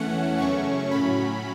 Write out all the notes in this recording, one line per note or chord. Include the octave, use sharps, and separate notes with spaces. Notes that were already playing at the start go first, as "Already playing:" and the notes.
Already playing: E2 E3 A3 C#4 F#5
F#2 C#3 A3 C#4 C#6
A2 F#3 C#4 B5